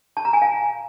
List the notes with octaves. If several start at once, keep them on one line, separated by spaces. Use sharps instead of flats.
A5
A#5
G#5
F5